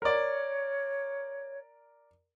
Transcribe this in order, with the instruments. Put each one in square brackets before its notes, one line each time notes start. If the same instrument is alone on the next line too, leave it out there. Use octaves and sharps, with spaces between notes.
[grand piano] A#4 D5 [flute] C#5